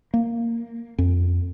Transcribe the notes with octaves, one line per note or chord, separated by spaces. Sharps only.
A#3
F2